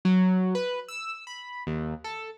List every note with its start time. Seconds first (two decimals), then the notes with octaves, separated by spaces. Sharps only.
0.05 F#3
0.55 B4
0.89 E6
1.27 B5
1.67 D#2
2.04 A4